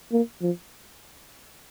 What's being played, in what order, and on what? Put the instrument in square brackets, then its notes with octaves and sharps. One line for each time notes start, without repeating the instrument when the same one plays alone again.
[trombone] A#3
F3